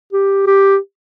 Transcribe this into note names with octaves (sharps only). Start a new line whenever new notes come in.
G4
G4